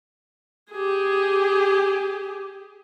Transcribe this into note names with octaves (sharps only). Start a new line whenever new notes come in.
G4 G#4